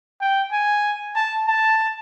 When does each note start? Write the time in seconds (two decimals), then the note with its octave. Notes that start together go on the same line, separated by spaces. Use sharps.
0.21 G5
0.52 G#5
1.15 A5
1.47 A5